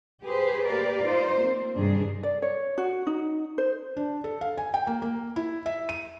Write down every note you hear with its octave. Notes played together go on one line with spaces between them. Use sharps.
G4 G#4 B4 C5
A#3 G4 A#4 B4 D5 F5
D#4 F4 C5
A#3 C4
G2 C3 D#3 D4 G#4
D5
C#5
F#4
D#4
C5
D4
A4
F5
G#5
G5
A#3
A#3
E4
E5
D#7